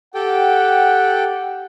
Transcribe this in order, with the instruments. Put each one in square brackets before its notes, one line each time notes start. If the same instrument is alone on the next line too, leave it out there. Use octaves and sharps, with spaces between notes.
[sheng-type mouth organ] G4 A4 G5 [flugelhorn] F#5